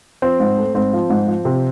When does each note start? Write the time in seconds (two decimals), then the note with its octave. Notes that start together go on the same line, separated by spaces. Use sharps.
0.22 F3 C4
0.40 G#2
0.58 A3
0.74 G#2 C4
0.93 F3
1.10 G#2
1.27 F3
1.45 C3